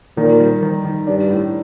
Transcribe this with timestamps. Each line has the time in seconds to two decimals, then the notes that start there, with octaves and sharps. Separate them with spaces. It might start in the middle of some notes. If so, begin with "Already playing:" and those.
0.16 A#2 D#3
0.40 G3
0.62 D#3
0.85 D#3
1.07 G2 D4
1.30 A2